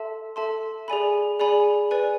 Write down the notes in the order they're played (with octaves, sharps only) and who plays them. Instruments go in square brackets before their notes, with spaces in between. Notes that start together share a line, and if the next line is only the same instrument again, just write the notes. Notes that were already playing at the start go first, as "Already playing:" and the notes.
Already playing: [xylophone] A4 E5 A5 C6
A4 E5 A5 C6
G#4 D5 G#5 B5
G#4 D5 G#5 B5
B4 D5 G#5